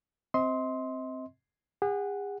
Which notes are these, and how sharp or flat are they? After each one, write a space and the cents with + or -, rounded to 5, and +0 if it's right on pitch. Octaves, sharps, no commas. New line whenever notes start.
C4 +0 D#5 +40 C6 +0
G#4 -40 F#5 +0